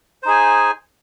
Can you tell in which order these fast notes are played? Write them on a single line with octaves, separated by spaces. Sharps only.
C5 D#4 G#4 G#5